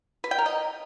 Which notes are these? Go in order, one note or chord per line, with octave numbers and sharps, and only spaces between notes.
B4
G5
A#4
D#5